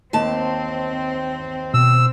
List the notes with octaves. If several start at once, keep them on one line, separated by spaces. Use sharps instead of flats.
D#2 C4 A5
B2 E6